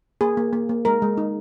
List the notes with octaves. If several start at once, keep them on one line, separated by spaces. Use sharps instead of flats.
A#3 G#4
A#3
A#3
A#3
G#3 A#4
G#3
D#4